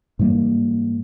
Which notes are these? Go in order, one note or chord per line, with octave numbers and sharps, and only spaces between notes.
G#2 E3 G3 A#3